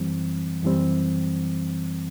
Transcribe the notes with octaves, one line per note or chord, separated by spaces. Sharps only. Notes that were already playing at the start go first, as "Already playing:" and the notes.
Already playing: F#2 E3 G3 C4
F#2 E3 G3 C4